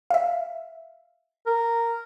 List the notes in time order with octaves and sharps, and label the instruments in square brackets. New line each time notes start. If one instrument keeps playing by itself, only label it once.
[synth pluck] E5 F5
[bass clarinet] A#4